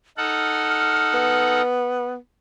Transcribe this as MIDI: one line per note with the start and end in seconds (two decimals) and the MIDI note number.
0.18 1.62 63
0.18 1.62 69
0.18 1.62 78
0.18 1.63 89
1.14 2.17 59